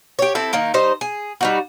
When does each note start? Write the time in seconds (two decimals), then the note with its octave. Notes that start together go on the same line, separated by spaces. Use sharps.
0.19 G4 C#5
0.35 C4 E4 A4
0.53 D#3 A#3 D#4
0.74 G3 D#4 C5 D#5
1.01 G#4
1.41 G3 D#4 F#4